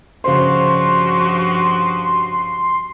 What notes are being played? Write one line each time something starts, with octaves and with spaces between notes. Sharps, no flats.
G2 C#3 F3 F#4 C5 C6